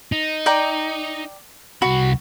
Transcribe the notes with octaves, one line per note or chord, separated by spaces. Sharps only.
D#4
D5 G5 A#5
C2 F#4 B5